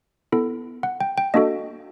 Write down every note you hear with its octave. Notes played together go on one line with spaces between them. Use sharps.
B3 E4 A4
F#5
G5
G5
A#3 D4 F#4 A4 D#5